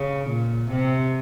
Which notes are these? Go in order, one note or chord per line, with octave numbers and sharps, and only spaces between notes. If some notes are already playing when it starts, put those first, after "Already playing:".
Already playing: C#3
A#2
C3